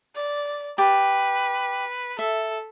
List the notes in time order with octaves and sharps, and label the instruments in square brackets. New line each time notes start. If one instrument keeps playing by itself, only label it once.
[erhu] D5
[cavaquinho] G4 A5 [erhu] B4
[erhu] A4 [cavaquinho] E5